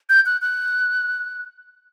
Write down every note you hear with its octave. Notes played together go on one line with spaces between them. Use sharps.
G6
F#6
F#6